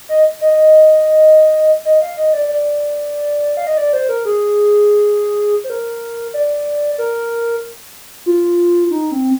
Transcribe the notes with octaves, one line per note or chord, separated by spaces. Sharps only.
D#5
D#5
D#5
F5
D#5
D5
D5
F5
D#5
D5
C5
A#4
G#4
C5
A#4
D5
A#4
F4
D#4
C4